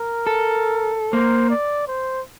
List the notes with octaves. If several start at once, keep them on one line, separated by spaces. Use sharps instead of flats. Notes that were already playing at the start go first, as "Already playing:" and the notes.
Already playing: A#4
A4
A#3 C5
D5
C5